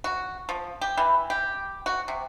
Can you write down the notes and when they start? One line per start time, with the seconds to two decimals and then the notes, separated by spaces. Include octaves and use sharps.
0.04 F#4
0.49 F3
0.81 G4
0.98 E3
1.30 G4
1.86 F#4
2.08 C3